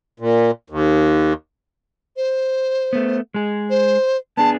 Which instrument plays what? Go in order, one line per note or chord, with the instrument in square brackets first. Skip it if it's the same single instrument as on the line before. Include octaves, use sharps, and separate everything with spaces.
[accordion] A#2
D#2
[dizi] C5
[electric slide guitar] A3 B3
G#3 G#4
[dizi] C5
[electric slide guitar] B3 D4 G#4 [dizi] A5